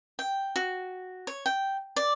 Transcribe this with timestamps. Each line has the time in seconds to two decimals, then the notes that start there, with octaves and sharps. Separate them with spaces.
0.19 G5
0.56 F#4
1.27 C#5
1.46 G5
1.96 D5